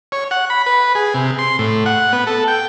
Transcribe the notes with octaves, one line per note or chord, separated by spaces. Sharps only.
C#5
F#5
B5
B4
G#4
C3
C6
A2
F#5
B3
A4
G5